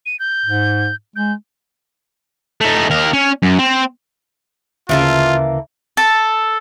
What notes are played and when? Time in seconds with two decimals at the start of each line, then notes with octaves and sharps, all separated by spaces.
0.06 D#7
0.20 G6
0.46 G#2
1.16 G#3 G6
2.61 A3 D#4
2.90 D#2 A#4
3.13 C#4
3.43 F#2
3.59 C4
4.89 D2 C#3 E3 A#3 F4 A5
5.97 A4